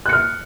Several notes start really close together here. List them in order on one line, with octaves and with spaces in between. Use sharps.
F#6 C#7 F6